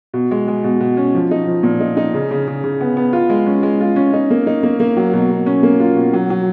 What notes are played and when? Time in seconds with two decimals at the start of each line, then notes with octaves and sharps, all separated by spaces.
0.14 B2
0.31 G#3
0.48 G#3
0.64 B2
0.80 B2
0.97 C#4
1.15 F3
1.31 D#4
1.47 F3
1.63 A#2
1.80 D#4
1.97 D#4
2.14 C#3
2.31 C#3
2.48 C#3
2.64 C#3
2.81 B3
2.97 B3
3.13 F4
3.30 G#3
3.46 C#4
3.63 G#3
3.81 F4
3.96 C#4
4.13 D#4
4.30 A#3
4.47 D#4
4.63 A#3
4.80 A#3
4.97 F#3
5.13 B2
5.30 B2
5.46 C#4
5.63 A#3
5.80 F4
5.96 B2
6.14 F#3
6.30 F#3